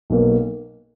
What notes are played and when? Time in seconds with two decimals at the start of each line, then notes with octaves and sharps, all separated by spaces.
0.10 B1 B2 A#3